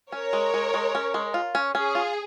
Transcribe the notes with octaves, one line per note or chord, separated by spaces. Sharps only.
C#4 A#4 C#5
G#3
G#3
G#3
C#4
G#3
F4
C#4
C#4 G#4
F4